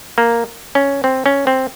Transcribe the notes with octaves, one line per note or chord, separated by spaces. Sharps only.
A#3
C#4
C4
C#4
C4